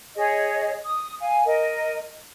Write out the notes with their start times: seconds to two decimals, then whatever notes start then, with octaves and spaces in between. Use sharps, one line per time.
0.15 G#4 C#5 D#5
0.85 D#6
1.21 F5 G#5
1.45 A#4 D#5